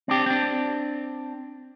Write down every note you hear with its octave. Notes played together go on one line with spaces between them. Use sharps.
C4 D4 G4
C4 D4